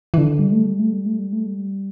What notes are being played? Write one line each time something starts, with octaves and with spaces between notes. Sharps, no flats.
E3
D3
G3
A3
G3
A3
G3
A3
G3
A3
G3